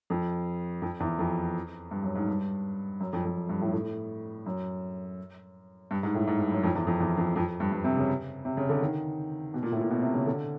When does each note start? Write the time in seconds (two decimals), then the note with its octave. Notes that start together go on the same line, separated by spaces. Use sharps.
0.10 F2
0.82 F2
1.00 E2
1.19 F2
1.91 G2
2.03 F#2
2.15 G#2
2.27 G2
3.00 F#2
3.13 F2
3.25 F2
3.49 G2
3.61 A2
3.73 A2
4.46 F#2
5.91 G2
6.03 G#2
6.14 A2
6.27 G#2
6.39 G2
6.52 F#2
6.63 F2
6.75 E2
6.87 F2
7.00 E2
7.17 F2
7.36 F2
7.60 G2
7.72 G2
7.84 C3
7.97 C#3
8.45 C3
8.57 C#3
8.69 D3
8.81 D#3
9.54 B2
9.63 A#2
9.72 A2
9.81 A#2
9.90 B2
10.02 C3
10.15 C#3
10.26 D3